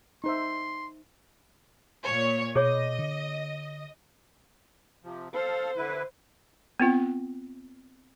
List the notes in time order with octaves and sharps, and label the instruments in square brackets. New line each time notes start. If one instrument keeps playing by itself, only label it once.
[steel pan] D#4 C5 E5 [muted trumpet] C6
[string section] A#2 C#5
[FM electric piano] B2 [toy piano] G#4 C#5 D6 [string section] D#5
[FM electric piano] D3
[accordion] C3 F3
[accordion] A4 F5 [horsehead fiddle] C5
[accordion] D3 E4 B4
[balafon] B3 C4 F4